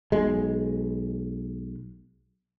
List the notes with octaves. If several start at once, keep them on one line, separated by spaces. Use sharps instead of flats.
B1 G#3